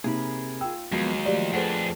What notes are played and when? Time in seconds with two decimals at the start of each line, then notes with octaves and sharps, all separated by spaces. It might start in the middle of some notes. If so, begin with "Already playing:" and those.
0.04 C3 A#3 D#4 G4 G#4 A#4 B5
0.61 F4 G5 E6
0.92 D#2 F3 F#3 G#3 B3
1.26 F3 A3 G4 D5
1.53 F2 A3 D4 G#4 B4 C5 F#5